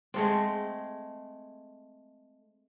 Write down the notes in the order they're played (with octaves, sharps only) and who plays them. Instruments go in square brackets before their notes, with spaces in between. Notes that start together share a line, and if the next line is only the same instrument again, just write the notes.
[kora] G#3 A3 C4